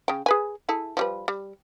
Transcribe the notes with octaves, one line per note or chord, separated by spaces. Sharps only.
C#3 G5
G#4 B4 G#5
E4 G#4 A4
F3 G3 B4
G3